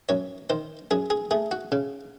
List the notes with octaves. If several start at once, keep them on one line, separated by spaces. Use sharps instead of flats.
F#2 C#5
D#3 C5
F#2 G#4
G#4
A3 G#4
F#4
C#3